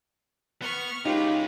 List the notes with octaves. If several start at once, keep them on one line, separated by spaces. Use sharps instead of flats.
B3 C#6 F6
G#3 C#4 D#4 F4 G4 B4